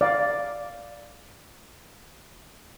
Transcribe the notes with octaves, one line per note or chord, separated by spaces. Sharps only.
D5 F5